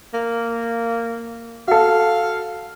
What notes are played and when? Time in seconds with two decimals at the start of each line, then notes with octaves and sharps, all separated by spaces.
0.14 A#3
1.68 F#4 A4 F5